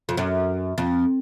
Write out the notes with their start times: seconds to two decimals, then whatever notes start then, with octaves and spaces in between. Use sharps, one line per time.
0.09 F2
0.17 F#2
0.78 F2